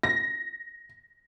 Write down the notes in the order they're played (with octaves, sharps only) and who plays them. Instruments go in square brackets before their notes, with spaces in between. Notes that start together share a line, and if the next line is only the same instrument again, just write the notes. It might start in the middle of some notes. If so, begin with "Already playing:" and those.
[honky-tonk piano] A#6